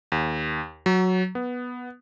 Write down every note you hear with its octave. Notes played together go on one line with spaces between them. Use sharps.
D#2
F#3
B3